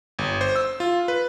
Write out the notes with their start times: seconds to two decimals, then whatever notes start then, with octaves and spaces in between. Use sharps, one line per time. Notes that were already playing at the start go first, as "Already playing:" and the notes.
0.19 G1
0.41 C5
0.56 E6
0.80 F4
1.08 B4